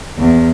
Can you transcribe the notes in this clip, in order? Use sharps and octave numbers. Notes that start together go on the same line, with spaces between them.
E2